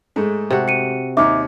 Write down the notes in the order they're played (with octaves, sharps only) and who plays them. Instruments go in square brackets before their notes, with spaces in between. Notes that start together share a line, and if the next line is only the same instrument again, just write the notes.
[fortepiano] G#2 G#3 A3
[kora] C3 F#4
[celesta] C#7 D#7
[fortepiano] D#2 D#4 [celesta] E5 D6